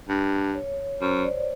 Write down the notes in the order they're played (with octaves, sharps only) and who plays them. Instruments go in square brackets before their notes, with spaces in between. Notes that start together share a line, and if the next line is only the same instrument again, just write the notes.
[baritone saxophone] G2
[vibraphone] C#5
[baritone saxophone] F#2 [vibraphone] C5
[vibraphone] D5